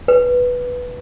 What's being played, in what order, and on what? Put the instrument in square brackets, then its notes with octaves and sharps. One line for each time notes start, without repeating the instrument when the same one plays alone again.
[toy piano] B4